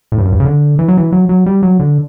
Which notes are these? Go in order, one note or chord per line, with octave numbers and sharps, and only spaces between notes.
A2
G2
F#2
G2
C#3
D3
E3
F#3
E3
F#3
F#3
G3
F#3
D3